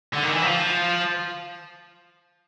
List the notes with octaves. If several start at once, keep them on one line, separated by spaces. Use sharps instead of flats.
D3
D#3
E3
F3